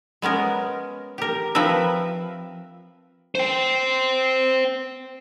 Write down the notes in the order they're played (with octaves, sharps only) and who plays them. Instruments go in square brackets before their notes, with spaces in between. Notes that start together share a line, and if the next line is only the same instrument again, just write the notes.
[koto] G#3 B3 C#4 A#4
G4 A#4
F3 C4 A#4 B4 E5
[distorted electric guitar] C5 G5